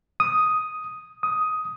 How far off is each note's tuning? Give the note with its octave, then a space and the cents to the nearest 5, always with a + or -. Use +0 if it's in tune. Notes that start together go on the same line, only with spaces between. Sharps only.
D#6 +5
D#6 +10